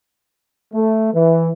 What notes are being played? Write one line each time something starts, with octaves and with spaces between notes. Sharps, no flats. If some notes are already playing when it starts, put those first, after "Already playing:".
A3
E3